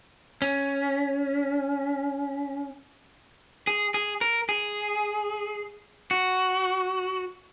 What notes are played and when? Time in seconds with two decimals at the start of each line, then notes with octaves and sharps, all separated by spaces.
0.42 C#4
3.67 G#4
3.94 G#4
4.21 A#4
4.49 G#4
6.11 F#4